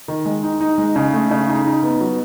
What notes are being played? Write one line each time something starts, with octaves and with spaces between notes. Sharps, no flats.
D#3
G#3
D#4
D#4
G#3
C#3
A3
C#3
D#4
D#4
B3
F#3